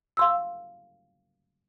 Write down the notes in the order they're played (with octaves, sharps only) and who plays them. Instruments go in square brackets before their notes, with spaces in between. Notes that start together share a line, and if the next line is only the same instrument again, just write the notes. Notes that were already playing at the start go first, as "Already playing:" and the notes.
[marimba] F5 C6 E6